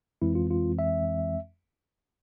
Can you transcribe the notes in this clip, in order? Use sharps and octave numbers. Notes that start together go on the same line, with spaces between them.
F2 E3 G#3 C4 E4
F4
F4
E5